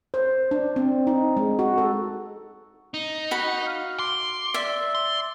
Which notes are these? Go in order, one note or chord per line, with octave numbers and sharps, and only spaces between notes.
C5
D4
C4
D#4
G#3
F#4
A4
D#4
F#4 B5
F5
C6 D6
D5 E5
C6